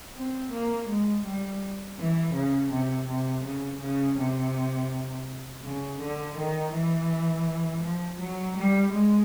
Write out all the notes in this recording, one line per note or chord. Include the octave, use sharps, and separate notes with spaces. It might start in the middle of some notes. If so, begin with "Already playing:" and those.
C4
A#3
G#3
G3
E3
C#3
C3
C3
C#3
C#3
C3
C#3
D3
D#3
E3
F3
F#3
G3
G#3